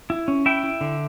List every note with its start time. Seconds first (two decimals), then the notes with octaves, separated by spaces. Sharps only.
0.10 E4
0.28 C#4
0.46 E4 E5 G5
0.63 E4
0.81 D3